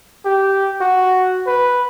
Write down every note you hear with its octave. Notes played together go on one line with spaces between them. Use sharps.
G4
F#4
B4